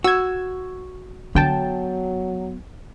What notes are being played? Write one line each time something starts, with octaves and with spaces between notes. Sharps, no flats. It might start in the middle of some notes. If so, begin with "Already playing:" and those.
F#4 E6 G#6
D3 F#3 B3 G5 A5